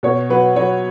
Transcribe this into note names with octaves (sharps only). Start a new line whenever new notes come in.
B2 C#5
F#3 B4
F#3 C#5